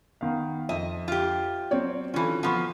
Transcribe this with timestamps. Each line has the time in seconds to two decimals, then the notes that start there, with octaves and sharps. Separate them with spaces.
0.21 D#3 B3 F5
0.69 F2 D#5 E5
1.08 F4 G4
1.71 F#3 C4 C#5 D5
2.14 E3 C#4 F4 A4
2.43 F3 B3 F#5 C6 C#6